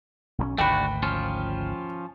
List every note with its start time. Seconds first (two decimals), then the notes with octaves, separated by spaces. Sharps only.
0.38 B1 G3 C#4
0.58 G#1 D2 G#2 A3 D4 F#4 G5 B5
1.03 F3 C#4 F4